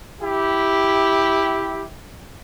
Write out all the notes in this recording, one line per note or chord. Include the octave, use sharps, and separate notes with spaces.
E4 G4